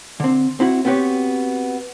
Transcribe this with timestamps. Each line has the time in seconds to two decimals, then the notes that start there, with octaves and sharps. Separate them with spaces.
0.20 D3 C4
0.60 C4 E4 F#4
0.85 B3 C4 F#4 G4 C#5